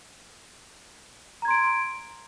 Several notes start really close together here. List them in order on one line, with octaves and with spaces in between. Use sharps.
A#5 G#6 C6 D7